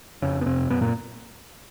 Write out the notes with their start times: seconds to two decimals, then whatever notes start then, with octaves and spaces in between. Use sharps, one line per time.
0.22 F2 C#3 C#4
0.41 B3
0.46 F2 C3 C4
0.69 F#2 B2 B3
0.81 A#2 A#3